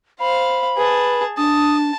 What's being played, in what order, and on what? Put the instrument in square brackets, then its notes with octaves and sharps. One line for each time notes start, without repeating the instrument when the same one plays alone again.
[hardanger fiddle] C5 F5 [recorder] B5
[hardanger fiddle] G#4 A5 [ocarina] B4
[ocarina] D4 [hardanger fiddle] A5 [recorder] D#6